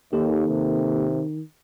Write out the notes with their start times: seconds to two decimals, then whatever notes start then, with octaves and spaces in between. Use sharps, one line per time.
0.13 D#2 D#3 A#3 G4 A4
0.48 C3